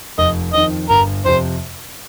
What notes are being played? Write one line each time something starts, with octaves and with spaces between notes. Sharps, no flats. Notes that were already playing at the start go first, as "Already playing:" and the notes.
F1 D#5
F2 D#3 D#5
G1 A#4
F2 C3 C5